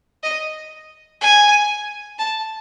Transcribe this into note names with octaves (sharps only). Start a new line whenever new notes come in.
D#5
G#5
A5